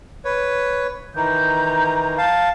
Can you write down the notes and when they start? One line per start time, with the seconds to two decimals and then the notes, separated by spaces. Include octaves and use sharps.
0.25 B4 C#5
1.15 D#3 E3 A#5 G6
2.18 F5 A5